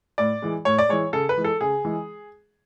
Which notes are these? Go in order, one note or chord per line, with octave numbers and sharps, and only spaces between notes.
A2 D5
E3 G#3
A2 C#5
D5
E3 G#3 C#5
C#3 A4
B4
E3 G#3
A4
C#3 G#4
E3 G#3